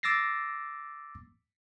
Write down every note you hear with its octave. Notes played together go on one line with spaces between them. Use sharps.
D6 E6 A6 A#6 C7